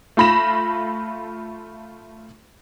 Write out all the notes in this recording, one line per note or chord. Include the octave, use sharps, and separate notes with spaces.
A3 F4 B5 A#6 E7